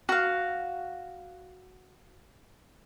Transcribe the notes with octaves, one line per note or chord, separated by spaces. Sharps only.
F#4 F5